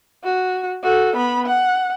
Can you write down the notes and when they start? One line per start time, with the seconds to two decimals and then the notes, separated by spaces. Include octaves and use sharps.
0.24 F#4
0.83 F#4 A4
1.16 B3 B5
1.46 F#5